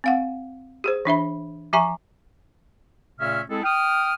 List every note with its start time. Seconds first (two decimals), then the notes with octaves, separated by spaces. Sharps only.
0.04 C4 F5 F#5
0.84 G4 G#4 C5
1.05 E3 D4 E5 B5
1.73 F3 G4 E5 G#5 A#5 C#6
3.19 A#2 C#3 A3 C#4 E5 F6
3.49 G#3 C4 E4 G#4 A4
3.64 G5 D#6 F6